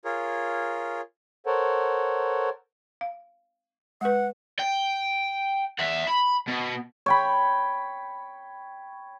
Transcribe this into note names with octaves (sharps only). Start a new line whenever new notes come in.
F4 G#4 A#4 C#5
A4 A#4 C5 C#5 F#5
F5
G#3 B4 F#5
G5
E5 F#5
B5
B2
C#5 G5 B5